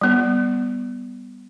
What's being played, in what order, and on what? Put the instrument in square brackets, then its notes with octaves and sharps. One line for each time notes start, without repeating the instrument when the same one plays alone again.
[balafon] G3 B3